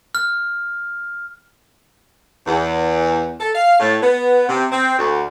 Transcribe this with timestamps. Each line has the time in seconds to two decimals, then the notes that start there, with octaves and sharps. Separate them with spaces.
0.15 F6
2.46 E2
3.40 A4
3.54 F5
3.80 A2
4.02 B3
4.49 C3
4.71 C4
4.98 D2